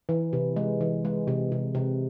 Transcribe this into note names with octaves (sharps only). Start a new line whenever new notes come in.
E3
C3
G#3
E3
G#3
C3
C3
C3